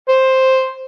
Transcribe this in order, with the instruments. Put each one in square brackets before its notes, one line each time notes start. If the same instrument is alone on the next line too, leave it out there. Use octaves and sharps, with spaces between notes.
[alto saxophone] C5